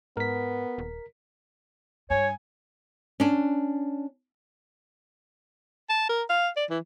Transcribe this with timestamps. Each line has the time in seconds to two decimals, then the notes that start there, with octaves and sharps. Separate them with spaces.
0.17 G#2 B3 A#4 B6
0.78 D#1
2.10 G2 C#5 G#5
3.20 C#4 D4
5.89 A5
6.09 A#4
6.29 F5
6.57 D5
6.70 E3